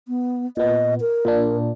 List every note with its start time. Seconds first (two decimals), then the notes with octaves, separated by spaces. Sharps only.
0.08 B3
0.57 A#2 B3 D#5
1.01 A#4
1.25 A#2 A#3 D4